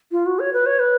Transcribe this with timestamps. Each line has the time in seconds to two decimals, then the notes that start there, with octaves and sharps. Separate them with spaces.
0.12 F4
0.26 F#4
0.39 C#5
0.53 B4
0.66 C#5
0.79 B4